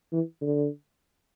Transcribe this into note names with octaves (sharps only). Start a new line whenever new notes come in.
E3
D3